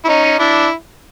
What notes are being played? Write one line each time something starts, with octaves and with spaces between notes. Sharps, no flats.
E4
C#4 D#4
D4 E4